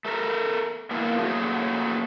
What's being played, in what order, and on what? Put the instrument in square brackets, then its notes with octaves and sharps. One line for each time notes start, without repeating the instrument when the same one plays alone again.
[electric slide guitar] A3 A4 A#4
A#3 B3 D4 E4 F4 A#4
F#3 A3 A#3 F#4 G#4